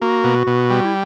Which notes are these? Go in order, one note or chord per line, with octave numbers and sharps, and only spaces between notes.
A#3 F#4
B2
B2
G3
E4